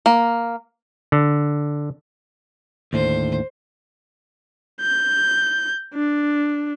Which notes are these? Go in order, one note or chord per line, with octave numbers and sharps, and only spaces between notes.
A#3
D3
D#2 A2 D3 C5
G6
D4